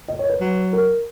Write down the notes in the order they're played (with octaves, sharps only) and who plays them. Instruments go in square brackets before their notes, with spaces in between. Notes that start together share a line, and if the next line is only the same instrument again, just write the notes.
[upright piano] D#5
C#5
B4
[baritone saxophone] F#3
[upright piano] A#4